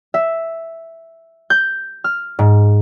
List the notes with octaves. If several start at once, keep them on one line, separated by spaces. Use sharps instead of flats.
E5
G6
F6
G#2